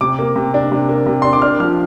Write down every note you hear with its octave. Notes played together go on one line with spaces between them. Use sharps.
C3 D6
A#3
C3
D4
C3
A#3
C3
D4 C6
D6
D4 F6
F3 F6